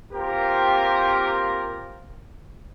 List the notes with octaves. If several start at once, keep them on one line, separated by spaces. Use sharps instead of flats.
A#3 C4 F4 G4 A#4